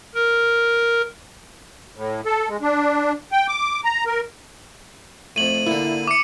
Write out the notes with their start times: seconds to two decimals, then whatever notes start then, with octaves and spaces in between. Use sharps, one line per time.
0.15 A#4
1.96 A2
2.25 A4
2.49 G#3
2.62 D4
3.32 G5
3.48 D6
3.84 A#5
4.06 A#4
5.36 F2 A2 D#7 F#7
5.67 A#2 D3 E4
6.07 D6 C#7